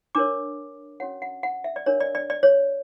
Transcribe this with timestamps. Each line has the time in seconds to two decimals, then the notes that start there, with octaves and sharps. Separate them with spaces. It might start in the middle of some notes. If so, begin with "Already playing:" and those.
0.15 D4 A#4 C#5 D6
1.00 C#4 F#4 C#5 F#5
1.22 F#5
1.43 F#5
1.64 E5
1.76 D5
1.86 D4 A#4 C#5
2.00 D5
2.15 D5
2.30 D5
2.43 C#5